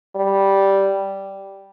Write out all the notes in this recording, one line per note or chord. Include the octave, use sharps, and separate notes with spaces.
G3